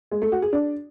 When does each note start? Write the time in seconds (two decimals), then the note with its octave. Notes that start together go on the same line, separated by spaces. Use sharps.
0.11 G#3
0.22 A3
0.32 F#4
0.42 G#4
0.53 D4